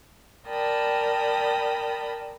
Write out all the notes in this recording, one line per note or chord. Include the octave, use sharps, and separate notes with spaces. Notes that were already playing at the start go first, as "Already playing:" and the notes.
A#4 D5 G5 A5 B5 D#6